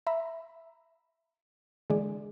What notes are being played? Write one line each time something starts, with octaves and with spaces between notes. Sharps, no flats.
E5 A#5 B5
D3 E3 G#3 G#4 D5